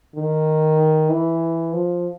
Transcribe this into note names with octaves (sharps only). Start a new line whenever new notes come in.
D#3
E3
F3